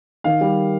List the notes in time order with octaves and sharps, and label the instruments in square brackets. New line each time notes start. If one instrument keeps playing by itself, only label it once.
[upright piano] D#3 F5
G3